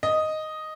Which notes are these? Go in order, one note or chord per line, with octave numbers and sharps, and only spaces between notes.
D#5